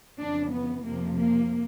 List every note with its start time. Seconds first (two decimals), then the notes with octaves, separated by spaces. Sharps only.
0.20 F2 C#3 E3 D4
0.52 B3
0.85 F2 C3 F3 A#3
1.17 A#3